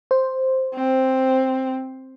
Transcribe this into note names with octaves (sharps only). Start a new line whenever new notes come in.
C5
C4